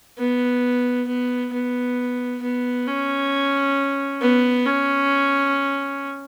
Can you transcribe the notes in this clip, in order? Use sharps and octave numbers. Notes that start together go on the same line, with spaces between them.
B3
B3
B3
B3
C#4
B3
C#4